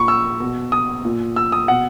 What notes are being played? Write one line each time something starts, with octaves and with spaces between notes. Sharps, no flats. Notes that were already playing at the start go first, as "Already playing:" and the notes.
Already playing: A#2 B5 C#6
E6
B2
D#6
A#2
E6
D#6
B2 F#5